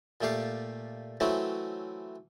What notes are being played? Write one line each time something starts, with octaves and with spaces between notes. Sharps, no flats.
A#2 A3 G4 F5
E3 F#3 A3 C4 C#4